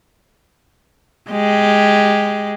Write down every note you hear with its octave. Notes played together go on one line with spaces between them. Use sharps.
G#3 G4